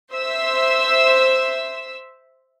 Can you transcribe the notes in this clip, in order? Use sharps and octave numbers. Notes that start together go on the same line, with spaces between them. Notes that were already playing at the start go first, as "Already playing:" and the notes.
C5 E5 E6